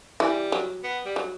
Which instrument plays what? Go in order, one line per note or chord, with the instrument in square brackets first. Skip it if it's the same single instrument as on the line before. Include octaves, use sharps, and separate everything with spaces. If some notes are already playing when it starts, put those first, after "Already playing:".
[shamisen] E3 [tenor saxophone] G3
[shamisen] F#3
[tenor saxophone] B3
G3
[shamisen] F#3